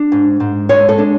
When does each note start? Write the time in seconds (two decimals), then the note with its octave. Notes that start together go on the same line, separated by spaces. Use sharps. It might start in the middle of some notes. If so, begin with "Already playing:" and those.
Already playing: D4
0.12 G#2
0.40 G#2
0.69 G#3 C#5
0.89 A4
0.98 D4